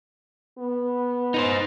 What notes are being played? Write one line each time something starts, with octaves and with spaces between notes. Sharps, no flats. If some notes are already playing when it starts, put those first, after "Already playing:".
B3
D#4 B4 C5